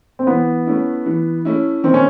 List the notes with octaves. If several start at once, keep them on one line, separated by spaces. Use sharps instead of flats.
C4
E3 B3
A3 C#4 E4
E3
A3 C#4 E4
D#3 C4
C#4